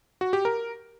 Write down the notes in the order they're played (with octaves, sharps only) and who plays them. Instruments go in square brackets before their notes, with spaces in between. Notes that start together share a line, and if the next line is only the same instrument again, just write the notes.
[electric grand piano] F#4
G4
A#4